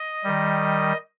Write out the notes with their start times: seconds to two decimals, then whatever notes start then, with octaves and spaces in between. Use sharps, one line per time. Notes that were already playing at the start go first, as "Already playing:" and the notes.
Already playing: D#5
0.24 D#3 G3